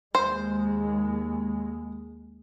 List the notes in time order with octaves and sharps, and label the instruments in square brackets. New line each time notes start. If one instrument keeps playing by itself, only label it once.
[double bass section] D#2 G#3 [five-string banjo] C5